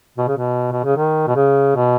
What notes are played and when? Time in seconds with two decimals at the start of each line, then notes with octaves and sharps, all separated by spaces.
0.18 B2
0.28 C#3
0.38 B2
0.72 B2
0.84 C#3
0.97 D#3
1.27 B2
1.36 C#3
1.76 B2